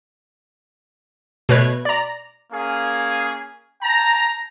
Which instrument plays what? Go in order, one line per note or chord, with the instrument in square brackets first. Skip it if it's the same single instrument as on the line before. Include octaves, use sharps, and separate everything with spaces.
[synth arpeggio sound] B2 A3 B4 C#5 F#6 G#6
D5 A#5
[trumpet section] A#3 C#4 G#4 F5 G#5
G5 A5 A#5